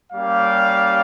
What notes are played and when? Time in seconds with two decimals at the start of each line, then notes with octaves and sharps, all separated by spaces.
0.12 G3 A#3 C#4 G4 F5